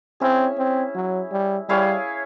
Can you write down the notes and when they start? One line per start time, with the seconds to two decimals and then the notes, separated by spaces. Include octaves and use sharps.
0.20 C4 C#4 E4 G#4
0.58 C4
0.95 F#3
1.32 G3
1.69 G3 E4 G#4 C#5 F5